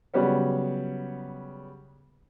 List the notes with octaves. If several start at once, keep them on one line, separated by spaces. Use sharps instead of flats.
C#3 F#3 G3 B3 C#4